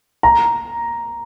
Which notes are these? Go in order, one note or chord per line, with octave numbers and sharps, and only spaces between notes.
A#5